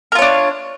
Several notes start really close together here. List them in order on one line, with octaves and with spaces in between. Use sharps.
A#4 F4 C#5 D4